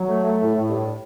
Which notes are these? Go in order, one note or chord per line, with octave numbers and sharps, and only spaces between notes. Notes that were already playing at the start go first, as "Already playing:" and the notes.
Already playing: F#3
A3
A3
A2
A2
G2